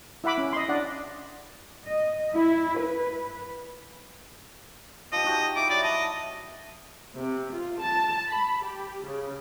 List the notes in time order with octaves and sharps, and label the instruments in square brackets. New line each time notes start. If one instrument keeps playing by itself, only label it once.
[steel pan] E4 E5 F#5 B5 D6
C#4
D#5 C6
D4 D5 F#5
[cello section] D#5
E4
B4
[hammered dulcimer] F3 G4 [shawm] D#5
[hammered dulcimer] D#4 F#4 G4
[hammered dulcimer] E4 B5 [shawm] D6
[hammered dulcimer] F#3 [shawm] D5
[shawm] D#5 [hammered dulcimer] A5
[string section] C3
F4
A5
B5
G4
C#3